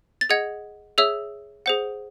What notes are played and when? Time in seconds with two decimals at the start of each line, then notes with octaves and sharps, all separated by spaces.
0.21 A6
0.30 G#4 D#5 F#5 G#6
0.98 G#4 C#5 E5 E6
1.66 G#4 C5 F#5